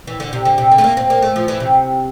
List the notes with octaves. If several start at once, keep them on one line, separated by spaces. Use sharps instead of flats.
E3
D3
C3
D3
C3
D3
A3
A#3
C4
A#3
A3
F3
E3
C3